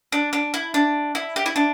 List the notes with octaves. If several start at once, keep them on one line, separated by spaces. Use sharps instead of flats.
D4
D4
E4
D4
E4
G4
E4
D4